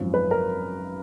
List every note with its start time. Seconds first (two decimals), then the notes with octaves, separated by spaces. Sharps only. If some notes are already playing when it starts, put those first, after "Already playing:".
Already playing: G#1 F#2 F3
0.14 B4
0.31 A#4